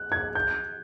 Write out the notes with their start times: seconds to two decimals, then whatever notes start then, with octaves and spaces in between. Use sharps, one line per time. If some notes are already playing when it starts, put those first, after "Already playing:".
Already playing: F#6
0.12 G#6
0.35 G6